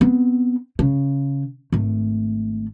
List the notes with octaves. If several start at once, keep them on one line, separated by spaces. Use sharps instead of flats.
B3 C4
C#3
G#1 A3